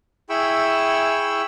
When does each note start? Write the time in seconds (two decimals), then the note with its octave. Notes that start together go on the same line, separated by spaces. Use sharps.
0.30 E4 G#4 G5 B5 C#6 E6